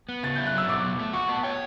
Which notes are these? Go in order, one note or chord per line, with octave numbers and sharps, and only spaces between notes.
B3
C#3 A6
E4 G6
F#6
F#3 E6
B2 D6
B2
A3
F#4 C#6
B3 A5
C#5 G5